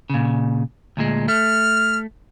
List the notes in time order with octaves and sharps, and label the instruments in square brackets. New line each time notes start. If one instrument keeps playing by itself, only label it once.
[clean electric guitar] A#2 C#3
D2 A#2 G#3
[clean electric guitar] A3 [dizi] F6